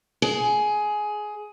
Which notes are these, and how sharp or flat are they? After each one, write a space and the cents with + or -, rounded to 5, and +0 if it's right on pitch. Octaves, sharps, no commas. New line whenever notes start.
G#4 +15